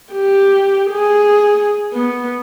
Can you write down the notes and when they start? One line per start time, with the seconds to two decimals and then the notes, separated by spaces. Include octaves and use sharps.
0.13 G4
0.91 G#4
1.94 B3